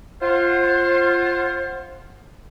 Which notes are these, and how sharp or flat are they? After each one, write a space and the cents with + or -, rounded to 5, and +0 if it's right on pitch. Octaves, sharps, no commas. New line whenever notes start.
F4 -10 C5 +25 F#5 +0